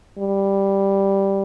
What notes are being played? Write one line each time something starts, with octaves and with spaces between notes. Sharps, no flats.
G3